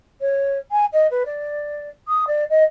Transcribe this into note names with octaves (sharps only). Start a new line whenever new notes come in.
C#5
G#5
D#5
B4
D5
D#6
D5
D#5